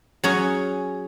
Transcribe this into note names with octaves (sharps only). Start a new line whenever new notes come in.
F#3 C#4 G#4 C#5